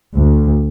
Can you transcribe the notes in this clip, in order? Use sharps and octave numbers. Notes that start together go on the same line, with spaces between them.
D2